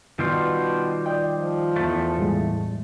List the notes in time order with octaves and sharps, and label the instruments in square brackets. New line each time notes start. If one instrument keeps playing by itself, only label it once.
[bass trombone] B2 [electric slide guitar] D#3 G3 F4
[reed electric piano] D5 D#5 G5
[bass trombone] F3
[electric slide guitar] E2 A3
[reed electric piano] A2 G3 G#3